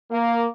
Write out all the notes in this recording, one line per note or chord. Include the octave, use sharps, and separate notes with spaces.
A#3